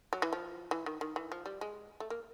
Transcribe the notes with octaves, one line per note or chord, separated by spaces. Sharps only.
F#3
E3
F3
E3
D#3
D#3
E3
F3
G3
G#3
A3
A#3